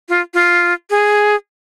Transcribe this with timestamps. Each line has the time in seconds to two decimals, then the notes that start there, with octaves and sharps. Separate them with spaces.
0.09 F4
0.34 F4
0.90 G#4